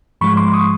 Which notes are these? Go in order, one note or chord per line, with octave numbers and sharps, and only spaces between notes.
G#2 F3 G#3 B5 C#6
C6 D6
C#6 D#6